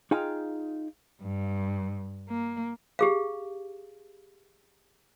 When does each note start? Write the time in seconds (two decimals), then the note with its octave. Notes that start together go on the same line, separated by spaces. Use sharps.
0.11 D#4 F4 G#4 F5 G5 A#5
1.22 G2
2.29 A#3
2.99 G4 G#4 F5